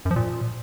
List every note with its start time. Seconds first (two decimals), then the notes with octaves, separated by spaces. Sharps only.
0.05 F#2
0.11 F3
0.16 A#2